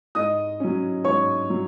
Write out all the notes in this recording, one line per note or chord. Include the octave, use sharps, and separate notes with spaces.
G#2 D#5 D#6
F#3 C#4
G#2 C#5 C#6
F#3